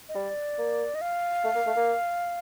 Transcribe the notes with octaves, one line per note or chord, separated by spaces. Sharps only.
D#5
G3 D5
A#3
D#5
F5
A3
A#3
A3
A#3